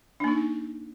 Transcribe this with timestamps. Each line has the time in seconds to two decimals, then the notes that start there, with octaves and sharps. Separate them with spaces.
0.20 D4
0.24 A#3
0.28 D#4